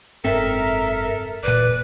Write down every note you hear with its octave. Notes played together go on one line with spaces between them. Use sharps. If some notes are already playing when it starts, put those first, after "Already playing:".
F#1 G#2 C4 A4 A#4 E5
E1 A#2 B4 D5